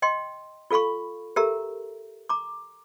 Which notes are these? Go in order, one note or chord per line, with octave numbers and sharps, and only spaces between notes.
D#5 G5 C6
F4 A4 F5 B5 C#6
G4 A4 A#4 E5 A#5
A#5 D6